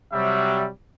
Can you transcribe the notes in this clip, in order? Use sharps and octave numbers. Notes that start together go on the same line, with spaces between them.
C3 F#3 G3 E5